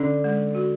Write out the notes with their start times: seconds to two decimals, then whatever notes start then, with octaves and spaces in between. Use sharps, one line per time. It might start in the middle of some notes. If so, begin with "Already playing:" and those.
Already playing: D3 C#4
0.24 G#3
0.55 F#4